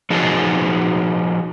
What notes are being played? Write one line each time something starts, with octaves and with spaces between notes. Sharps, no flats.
F3 D#4 F#4 G#4 C#5 A5